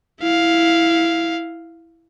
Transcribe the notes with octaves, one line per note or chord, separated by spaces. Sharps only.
E4 F5